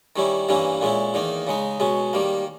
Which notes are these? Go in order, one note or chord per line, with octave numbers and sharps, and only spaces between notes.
D#3 G3 C#4 E4
G2 E3 A#3 C#4 E4
A#2 G#3 C#4 E4
E2 D#3 A#3 D#4
C#3 G#3 D#4
B2 G#3 C#4
D#3 G3 A#3